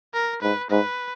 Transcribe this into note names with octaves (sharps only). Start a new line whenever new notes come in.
A#4
G#2 B4
G#2 B4